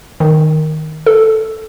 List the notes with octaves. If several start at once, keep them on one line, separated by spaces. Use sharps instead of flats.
D#3
A4